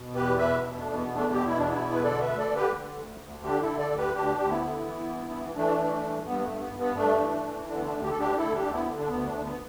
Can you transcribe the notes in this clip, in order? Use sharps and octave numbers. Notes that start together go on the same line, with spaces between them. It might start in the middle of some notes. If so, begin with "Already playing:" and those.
Already playing: B2
E2 G4 B4
B2 B4 E5
B2
A3 D4
E2
B3
E2
A3 D4
B2 G4
E4
E2 D4
B3 E4
B2
B4
D3 A4 D5
B4 E5
D2
A4 D5
D3
G4 B4
D3
D2
D2
D3 D4 G4
E4 A4
D3
A4 D5
D2
G4 B4
D2 D4 G4
D2 G4
B3 E4
D3
E3
G2
E3
E3 A3 D4
E3
G2
G2 B3
B3
A3
G2
B3
G2
B3
G2 A3 D4
E3
E3
D3 D4
B3
A3 D4
D2
G4
A4
D2 D4 G4
D2 E4 A4
D4 G4
D2
B3 E4
D3
D4
D2 B3
A3 D4
D2
B3